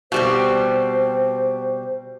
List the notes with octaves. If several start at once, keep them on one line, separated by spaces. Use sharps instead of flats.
B2 G3 C4 C5